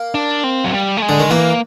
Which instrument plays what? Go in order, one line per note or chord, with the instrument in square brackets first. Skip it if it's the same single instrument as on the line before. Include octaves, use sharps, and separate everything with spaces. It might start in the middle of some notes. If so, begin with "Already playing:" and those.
Already playing: [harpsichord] A#3
[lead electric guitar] D4
C4
F#3
G3
A3
G#3
[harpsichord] D3
D#3
[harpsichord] E3 [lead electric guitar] A#3